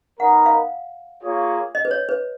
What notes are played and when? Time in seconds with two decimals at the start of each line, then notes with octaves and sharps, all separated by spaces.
0.20 B3 D#4 A#4 F#5
0.46 F5
1.22 A#3 F4 G#4 C#5
1.75 D#5
1.85 B4
1.91 C#5
2.09 B4